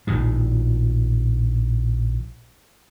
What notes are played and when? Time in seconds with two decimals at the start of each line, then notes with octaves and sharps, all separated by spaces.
0.07 A#1 A2 D#3 F3